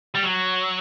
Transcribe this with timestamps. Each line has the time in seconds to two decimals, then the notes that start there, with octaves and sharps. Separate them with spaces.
0.15 G3
0.23 F#3